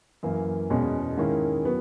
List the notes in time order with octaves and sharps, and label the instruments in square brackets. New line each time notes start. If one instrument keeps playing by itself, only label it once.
[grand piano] F#2 E3 A#3
E2 B2 G#3 C#4
G#2 D#3 A#3 C#4 E4
F#3 B3